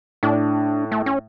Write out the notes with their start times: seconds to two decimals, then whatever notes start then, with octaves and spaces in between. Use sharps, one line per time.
0.23 A2 D4
0.92 A3
1.06 C#4